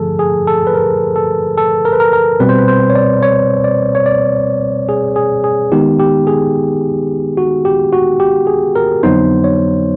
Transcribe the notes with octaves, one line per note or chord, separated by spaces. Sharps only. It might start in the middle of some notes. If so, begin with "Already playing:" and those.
Already playing: G2 D3 F3 A3 G#4 A4
G#4
A4
B4
A#4
A4
A4
A#4
B4
A#4
A#4
B2 G3 C4 B4
C5
B4
C5
C#5
D5
C#5
D5
C#5
D5
G#4
G#4
G#4
D#3 G#3 B3 D#4 G4
G4
G#4
F#4
G4
F#4
G4
G#4
A#4
F2 D3 F#3 B3 D#4 C5
C#5